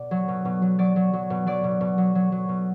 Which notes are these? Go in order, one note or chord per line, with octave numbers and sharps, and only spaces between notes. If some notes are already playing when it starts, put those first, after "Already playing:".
Already playing: B2 D5
F#3
B2
B2
F#3
F#3 D5
F#3
F#3
B2
F#3 D5
B2
B2
F#3
F#3
F#3
B2